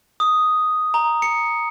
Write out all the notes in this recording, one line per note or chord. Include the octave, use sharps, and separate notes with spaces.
D#6
A#5
C#7